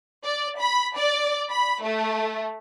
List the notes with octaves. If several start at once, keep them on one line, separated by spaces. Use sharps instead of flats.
D5
B5
D5
B5
A3